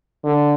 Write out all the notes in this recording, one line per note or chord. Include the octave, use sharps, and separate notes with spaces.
D3